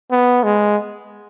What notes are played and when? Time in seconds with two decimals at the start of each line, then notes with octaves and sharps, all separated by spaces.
0.11 B3
0.43 G#3